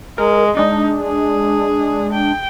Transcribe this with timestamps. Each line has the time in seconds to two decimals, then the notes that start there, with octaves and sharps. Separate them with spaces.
0.18 G#3 A#4
0.57 G#3 D4 D#4
1.01 G#4
2.12 G5